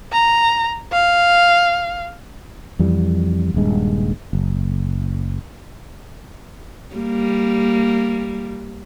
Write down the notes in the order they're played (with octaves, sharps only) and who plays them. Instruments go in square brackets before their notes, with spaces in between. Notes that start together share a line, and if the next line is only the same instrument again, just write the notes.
[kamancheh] A#5
F5
[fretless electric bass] F2 E3 G3
D#1 G2 G#3
F#1
[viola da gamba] G3 A#3